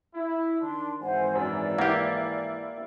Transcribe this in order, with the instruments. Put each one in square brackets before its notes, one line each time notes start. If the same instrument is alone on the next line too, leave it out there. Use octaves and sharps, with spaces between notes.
[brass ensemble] E4
[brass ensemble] D#3 D4 [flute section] C6
[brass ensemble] G#1 E3 [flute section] C5 F#5 G#5
[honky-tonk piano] F#2 [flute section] D5
[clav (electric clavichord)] A#3 G4 [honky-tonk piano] E4 F5